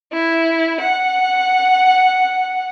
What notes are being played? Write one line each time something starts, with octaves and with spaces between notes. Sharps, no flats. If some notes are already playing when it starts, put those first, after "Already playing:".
E4
F#5